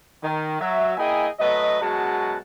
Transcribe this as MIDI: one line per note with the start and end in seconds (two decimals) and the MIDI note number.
0.23 0.60 51
0.60 0.96 54
0.60 0.96 76
0.98 1.28 58
0.98 1.28 64
0.98 1.28 68
0.98 1.28 75
0.98 1.28 79
0.98 1.28 80
1.40 1.81 54
1.40 1.81 57
1.40 1.81 71
1.40 1.81 75
1.81 2.37 42
1.81 2.37 47
1.81 2.37 56
1.81 2.37 66
1.81 2.37 78
1.81 2.37 81